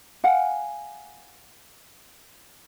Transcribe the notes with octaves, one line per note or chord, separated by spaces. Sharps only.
F5 F#5 G#5